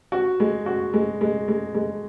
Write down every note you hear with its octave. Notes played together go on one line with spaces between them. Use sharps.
F#4
G#3
F#4
G#3
G#3
G#3
G#3